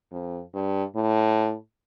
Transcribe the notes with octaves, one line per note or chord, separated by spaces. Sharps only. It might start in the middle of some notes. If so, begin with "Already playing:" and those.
F2
G2
A2